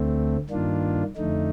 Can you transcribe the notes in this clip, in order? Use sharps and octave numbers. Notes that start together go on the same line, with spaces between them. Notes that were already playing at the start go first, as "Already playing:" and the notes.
Already playing: D2 D3 A3 C4
G2 D#3 A#3 D4 F4
F2 D3 A3 D#4